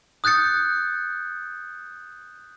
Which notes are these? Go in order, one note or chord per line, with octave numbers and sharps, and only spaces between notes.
D#6 F#6 G6 A6 C#7